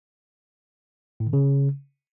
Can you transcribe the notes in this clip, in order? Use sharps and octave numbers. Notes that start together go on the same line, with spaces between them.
A2
D3
C#3